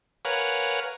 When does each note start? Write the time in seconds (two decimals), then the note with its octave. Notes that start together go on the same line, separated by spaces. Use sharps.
0.25 A#4 B4 C#5 F5 F#5 G#5